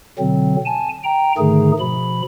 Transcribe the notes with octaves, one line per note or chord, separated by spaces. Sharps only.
B2 D3 F#3 C4
G#5 A5
G5 A#5
G#2 D3 D#3 A3 D#4 G#4
B2 F3 B5